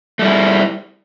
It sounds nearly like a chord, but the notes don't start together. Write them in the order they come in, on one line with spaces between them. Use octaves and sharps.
A3 G3 E4